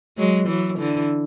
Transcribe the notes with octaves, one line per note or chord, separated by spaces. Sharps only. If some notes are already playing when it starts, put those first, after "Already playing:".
F#3 G#3
E3 F#3
D3 E3